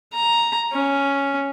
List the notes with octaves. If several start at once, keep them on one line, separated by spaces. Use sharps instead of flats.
A#5
C#4